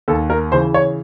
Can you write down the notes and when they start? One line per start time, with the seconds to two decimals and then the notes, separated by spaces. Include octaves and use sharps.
0.08 D#2 A4
0.30 A#4
0.52 C#3 E3 C5
0.74 C#5